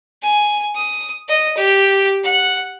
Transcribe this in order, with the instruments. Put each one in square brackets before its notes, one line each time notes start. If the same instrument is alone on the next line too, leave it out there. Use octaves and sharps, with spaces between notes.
[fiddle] G#5
D#6
D#5
G4
F#5